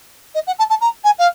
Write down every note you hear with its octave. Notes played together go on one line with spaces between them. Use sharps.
D#5
F#5
A5
A5
A#5
G#5
F5